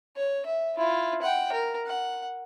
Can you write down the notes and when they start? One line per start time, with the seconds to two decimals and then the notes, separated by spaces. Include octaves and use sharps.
0.17 C#5
0.46 E5
0.78 E4 F4
1.22 F#5 G5
1.53 A#4
1.86 F#5